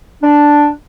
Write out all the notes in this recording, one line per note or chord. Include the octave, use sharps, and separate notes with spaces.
D4